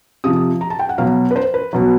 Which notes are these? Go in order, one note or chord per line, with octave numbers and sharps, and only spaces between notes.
C3 F3 D#6
D#6
A#5
A5
G5
F#5
B2 F#3 F5
B4
C5
B4
B2 F#3